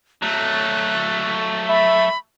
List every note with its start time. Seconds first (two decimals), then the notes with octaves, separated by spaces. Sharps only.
0.22 F#3 A3 F#6
1.69 E5 B5